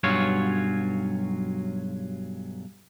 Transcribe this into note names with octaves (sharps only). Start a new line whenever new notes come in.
B1 G2 F#3 C#4 F4 C#5